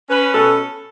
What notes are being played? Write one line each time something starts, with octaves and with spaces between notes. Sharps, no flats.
C#4 B4
B2 A4